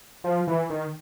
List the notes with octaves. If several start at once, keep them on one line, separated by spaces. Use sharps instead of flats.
F3
E3
D#3